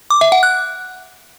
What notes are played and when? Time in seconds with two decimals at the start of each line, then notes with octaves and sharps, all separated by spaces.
0.10 D6
0.21 E5
0.32 F#5
0.43 F#6